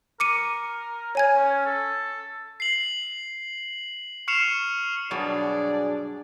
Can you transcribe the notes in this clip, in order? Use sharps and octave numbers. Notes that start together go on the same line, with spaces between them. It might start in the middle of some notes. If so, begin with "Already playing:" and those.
A#4 D6 C#7 D#7
C#5 G#5 G#6
C#4
A4
C7 F#7
C#6 F6 C7 C#7 E7 F7
G2 B2 F#3 D4 G#4 D5